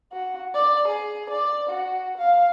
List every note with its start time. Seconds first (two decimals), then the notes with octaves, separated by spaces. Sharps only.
0.12 F#4
0.54 D5
0.88 G#4
1.30 D5
1.69 F#4
2.18 F5